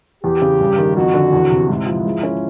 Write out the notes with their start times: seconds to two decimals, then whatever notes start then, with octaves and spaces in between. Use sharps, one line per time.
0.24 E2 G4
0.42 C#3
0.60 G2
0.78 D#3
0.96 F2 F#4
1.14 D3
1.33 E2
1.50 C3
1.69 G#2 E4
1.87 F3
2.05 G#3
2.23 C#4